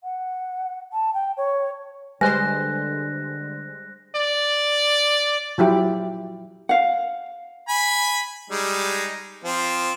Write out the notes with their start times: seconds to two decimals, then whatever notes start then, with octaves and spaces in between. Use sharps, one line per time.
0.04 F#5
0.93 A5
1.14 G5
1.37 C#5
2.21 D3 G3 G#3 B4 C5 G#5 F#6 A#6
4.16 D5
5.58 F3 F#3 E4 G4
6.69 F5 F#5
7.69 G#5 B5
8.50 G3 G#3 D#4
9.44 F3 C4